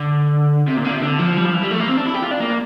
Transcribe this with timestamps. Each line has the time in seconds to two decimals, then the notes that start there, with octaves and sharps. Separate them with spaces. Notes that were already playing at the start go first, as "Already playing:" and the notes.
Already playing: D3
0.68 C3
0.77 A#2
0.85 D3
0.93 C3
1.02 D3
1.19 F3
1.37 G3
1.46 F3
1.54 E3
1.63 G3
1.71 A3
1.80 A#3
1.88 C4
1.98 D4
2.06 E4
2.14 G4
2.23 F4
2.31 D4
2.40 A#3